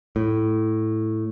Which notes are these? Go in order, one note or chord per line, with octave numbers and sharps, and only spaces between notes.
A2